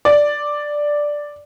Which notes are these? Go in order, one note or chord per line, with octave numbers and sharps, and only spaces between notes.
D5